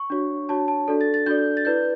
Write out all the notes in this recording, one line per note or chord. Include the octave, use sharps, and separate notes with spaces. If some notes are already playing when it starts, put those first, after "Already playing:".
Already playing: C#6
D4 F#4 C#5
D4 F#4 C#5 A5
A5
D4 F#4 A4 D5
A6
A6
D4 F#4 A4 D5 G6
A6
E4 B4 D5 G6